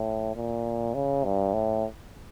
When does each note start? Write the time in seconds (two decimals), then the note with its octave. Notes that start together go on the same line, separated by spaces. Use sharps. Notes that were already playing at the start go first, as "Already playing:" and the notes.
Already playing: A2
0.36 A#2
0.95 C#3
1.24 G2
1.54 A2